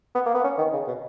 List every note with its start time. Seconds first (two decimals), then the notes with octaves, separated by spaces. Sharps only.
0.15 B3
0.26 A#3
0.34 B3
0.44 C#4
0.58 D#3
0.73 C#3
0.87 B2